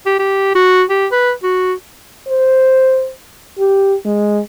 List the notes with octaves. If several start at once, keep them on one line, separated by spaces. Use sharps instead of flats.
G4
G4
F#4
G4
B4
F#4
C5
G4
G#3